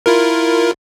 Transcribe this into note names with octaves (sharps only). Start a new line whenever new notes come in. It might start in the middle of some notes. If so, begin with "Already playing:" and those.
E4 F4 A#4